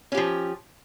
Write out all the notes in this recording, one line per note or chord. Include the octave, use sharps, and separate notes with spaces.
F3 C#4 G4